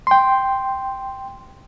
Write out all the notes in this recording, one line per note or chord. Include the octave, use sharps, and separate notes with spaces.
G5 C6